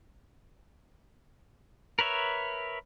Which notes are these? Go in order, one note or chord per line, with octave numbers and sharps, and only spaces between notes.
A#4 B4 C#5 E5